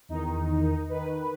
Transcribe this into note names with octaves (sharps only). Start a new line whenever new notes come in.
E2 D#3 D#4
D#3 B4